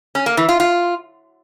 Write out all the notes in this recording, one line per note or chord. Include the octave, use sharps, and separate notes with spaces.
C#4
A#3
E3
F4
F4